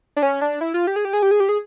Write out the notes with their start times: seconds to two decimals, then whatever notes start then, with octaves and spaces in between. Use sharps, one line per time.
0.17 D4
0.22 C#4
0.41 D4
0.61 E4
0.74 F4
0.87 G4
0.96 G#4
1.05 G4
1.13 G#4
1.22 G4
1.31 G#4
1.40 G4
1.49 G#4